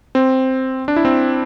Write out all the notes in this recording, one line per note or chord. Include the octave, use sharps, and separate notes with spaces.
C4
D4
E4
C4